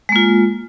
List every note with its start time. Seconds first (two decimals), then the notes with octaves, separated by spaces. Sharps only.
0.09 G#3
0.12 A#3
0.16 F4